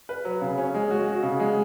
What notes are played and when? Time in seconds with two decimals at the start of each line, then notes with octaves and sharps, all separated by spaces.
0.09 B4
0.25 F#3
0.41 C#3
0.58 C#4
0.74 G#3
0.91 F#4
1.07 F#4
1.23 C#3
1.40 G#3